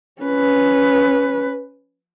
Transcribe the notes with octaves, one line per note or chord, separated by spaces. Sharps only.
C#4 B4